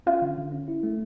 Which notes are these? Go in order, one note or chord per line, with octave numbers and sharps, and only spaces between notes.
C#4 F4
D3
D3
C#4
E4
A3